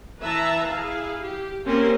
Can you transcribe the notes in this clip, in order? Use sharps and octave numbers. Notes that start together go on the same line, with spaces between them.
E3 B4 E5 A5 A#5
E4 G#4 F5
G4
A#3 C4 C#4 G4 A#4 C5